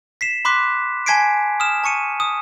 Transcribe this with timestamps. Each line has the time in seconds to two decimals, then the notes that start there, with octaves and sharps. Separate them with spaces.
0.21 B6 C7 E7
0.45 B5 C6 D6 F#6 B6
1.06 G#5 A5 G#6 B6 C7 D7
1.60 D#6 F6 E7
1.84 A5 C#6 C#7 D#7
2.20 D#6